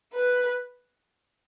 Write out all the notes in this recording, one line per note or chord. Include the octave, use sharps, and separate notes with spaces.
B4